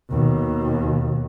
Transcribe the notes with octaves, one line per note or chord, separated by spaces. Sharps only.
D#2 B2